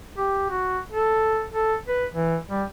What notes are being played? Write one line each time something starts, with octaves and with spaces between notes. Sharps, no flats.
G4
F#4
A4
A4
B4
E3
G3